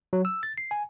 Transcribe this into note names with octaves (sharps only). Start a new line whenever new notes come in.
F#3
E6
A6
C7
G#5